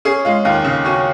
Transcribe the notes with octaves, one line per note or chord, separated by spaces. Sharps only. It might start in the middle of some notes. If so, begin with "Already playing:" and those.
C#4 G#4
G#3 F4
D#2 F4
C#3
C#4 F#4